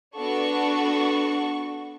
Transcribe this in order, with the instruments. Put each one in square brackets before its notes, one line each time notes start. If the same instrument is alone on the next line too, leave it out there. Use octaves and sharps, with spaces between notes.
[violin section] B3 D4 F#4 A4 C#6